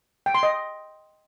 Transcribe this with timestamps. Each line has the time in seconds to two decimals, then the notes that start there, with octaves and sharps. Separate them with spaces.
0.26 G5
0.35 C6
0.43 D#5